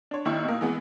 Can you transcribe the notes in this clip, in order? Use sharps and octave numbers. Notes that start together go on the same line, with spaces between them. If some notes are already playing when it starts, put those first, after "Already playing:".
D4 C#5
D#2 D#3 E4 C#6 E6
B2 A#3
E3 G#3 B3